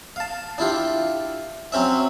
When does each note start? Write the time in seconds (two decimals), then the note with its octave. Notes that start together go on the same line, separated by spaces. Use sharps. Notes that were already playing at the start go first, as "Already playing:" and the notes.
0.16 F5 A5
0.58 D4 E4 F4 G4
1.72 F#3 C4 C#4 E5